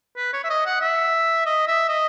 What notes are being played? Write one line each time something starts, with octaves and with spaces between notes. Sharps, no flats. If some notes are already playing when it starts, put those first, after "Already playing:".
B4
C#5
E5
D#5
F#5
E5
D#5
E5
D#5